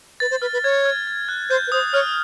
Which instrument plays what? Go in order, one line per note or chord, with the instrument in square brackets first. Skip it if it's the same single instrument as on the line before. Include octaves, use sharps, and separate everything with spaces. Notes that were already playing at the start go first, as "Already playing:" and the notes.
[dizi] B4 [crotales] A6
[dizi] C5
[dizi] B4 [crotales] F6
[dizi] B4
[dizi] C#5 [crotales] G#6
[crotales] F6
A6
F#6
[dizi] C5 [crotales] G6
[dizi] B4
[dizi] C5 [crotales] D#6
[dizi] C#5 [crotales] F6